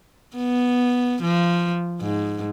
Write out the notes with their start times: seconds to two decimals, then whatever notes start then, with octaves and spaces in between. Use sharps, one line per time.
0.37 B3
1.22 F3
2.01 G#2